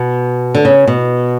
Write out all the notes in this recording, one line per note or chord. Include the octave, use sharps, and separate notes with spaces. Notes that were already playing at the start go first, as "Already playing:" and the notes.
Already playing: B2
D3
C#3
B2